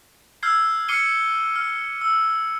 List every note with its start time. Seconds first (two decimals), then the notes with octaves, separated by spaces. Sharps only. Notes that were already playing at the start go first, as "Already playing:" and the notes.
0.43 E6 F6 G6 G#6 C7
0.88 D6 F6 C7 C#7 D#7 G7
1.56 F6
2.01 E6